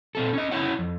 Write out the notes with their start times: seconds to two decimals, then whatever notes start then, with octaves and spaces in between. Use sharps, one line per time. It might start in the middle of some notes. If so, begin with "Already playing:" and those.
0.15 A#2 C4 A4
0.33 C#4 D#5
0.51 C#4 E4 C#5 F#5
0.79 F2